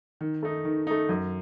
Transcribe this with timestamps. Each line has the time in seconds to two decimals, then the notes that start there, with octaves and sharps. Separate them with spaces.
0.21 D#3
0.42 A3 D#4
0.65 D#3
0.87 A3 D#4
1.09 F#2